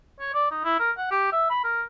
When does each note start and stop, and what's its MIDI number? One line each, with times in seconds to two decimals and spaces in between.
0.20 0.30 73
0.34 0.46 74
0.51 0.60 63
0.64 0.77 64
0.79 0.91 70
0.98 1.10 78
1.11 1.30 67
1.32 1.50 76
1.50 1.60 83
1.64 1.83 70